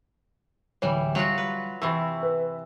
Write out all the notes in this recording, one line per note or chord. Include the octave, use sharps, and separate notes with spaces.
D1 E3 G3 C#5
F#3 G3 F4 F#4
B4
C3 E3 B5 C#6 E6
B4